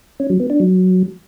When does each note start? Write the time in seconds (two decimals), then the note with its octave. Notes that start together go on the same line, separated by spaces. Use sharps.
0.20 C#4
0.30 F#3
0.40 B3
0.50 D4
0.60 F#3